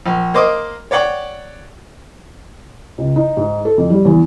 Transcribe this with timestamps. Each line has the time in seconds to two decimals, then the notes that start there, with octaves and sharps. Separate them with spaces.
0.06 A#1
0.34 A#3 C5 D#5 D6 D#6
0.91 C#5 D5 F#5 G5 D6
2.98 C#2
3.16 D#4
3.37 G#2
3.65 A4
3.78 F2
3.90 G3
4.05 E2